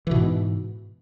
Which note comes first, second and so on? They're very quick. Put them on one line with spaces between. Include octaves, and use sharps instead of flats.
E3 B2 G#2